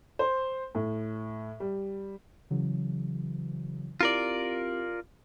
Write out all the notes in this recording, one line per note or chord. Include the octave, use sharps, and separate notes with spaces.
C5
A2
G3
C#3 E3 F#3
C4 E4 F4 G4 A#4 D5